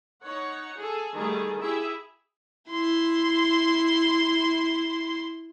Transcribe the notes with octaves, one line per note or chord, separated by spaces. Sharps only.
D#4 C#5 F#5
G#4 A4
D#3 G3 A3 G#4
E4 G4 G#4 E5
E4 C6